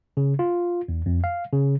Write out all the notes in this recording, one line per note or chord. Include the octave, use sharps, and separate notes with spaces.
C#3
F4
E2
F2
F5
C#3